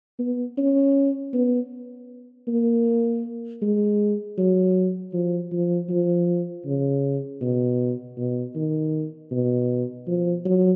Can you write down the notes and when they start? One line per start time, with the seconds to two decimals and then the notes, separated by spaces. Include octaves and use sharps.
0.19 B3
0.58 C#4
1.33 B3
2.47 A#3
3.62 G#3
4.38 F#3
5.13 F3
5.52 F3
5.89 F3
6.65 C#3
7.41 B2
8.18 B2
8.55 D#3
9.31 B2
10.07 F3
10.45 F#3